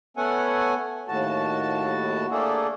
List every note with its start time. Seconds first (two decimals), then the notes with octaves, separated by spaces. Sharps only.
0.17 A3 B3 C#4 A4 F#5 G#5
1.08 D#2 A2 F#4 A5
2.31 A3 A#3 D4 G#4 A4